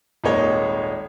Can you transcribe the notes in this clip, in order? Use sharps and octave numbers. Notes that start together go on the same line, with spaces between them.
D#1 G#1 G#3 A#3 D#4 C#5